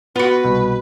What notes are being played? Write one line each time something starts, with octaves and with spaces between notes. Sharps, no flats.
B3 F4 F#4 B4
C2 B2